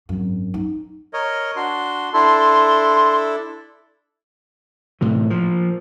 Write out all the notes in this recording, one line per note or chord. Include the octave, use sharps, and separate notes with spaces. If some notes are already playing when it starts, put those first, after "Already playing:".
G#1 F#2
D#4
A#4 C#5 D#5
D4 F#4 C6
D4 E4 A4 C6
A2 C3 E3
A#2 F3